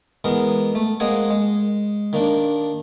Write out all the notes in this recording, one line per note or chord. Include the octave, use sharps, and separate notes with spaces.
E3 G#3 B3 A#4
A3
G#3 A#3 C4 D#5 F#5 G#5
G#3
D#3 A#3 D4